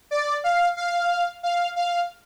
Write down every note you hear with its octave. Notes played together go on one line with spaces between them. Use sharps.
D5
F5
F5
F5
F5